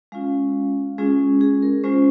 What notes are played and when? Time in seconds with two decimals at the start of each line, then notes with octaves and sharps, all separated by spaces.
0.12 G#3 C#4 F4 F5
0.98 G#3 C#4 F4 G#4
1.41 G#4
1.62 A#4
1.84 G#3 C#4 F4 C5